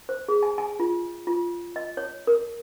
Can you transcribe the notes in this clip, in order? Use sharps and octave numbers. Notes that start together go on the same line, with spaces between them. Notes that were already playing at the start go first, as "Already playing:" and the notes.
C5
G#4
G#5
G#5
F4
F4
D#5
C#5
A#4